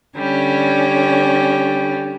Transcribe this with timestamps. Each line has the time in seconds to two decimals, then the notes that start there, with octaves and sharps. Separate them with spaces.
0.16 D3 G3 C#4